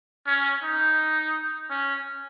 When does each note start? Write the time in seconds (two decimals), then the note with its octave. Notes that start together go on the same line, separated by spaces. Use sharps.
0.27 C#4
0.63 D#4
1.70 C#4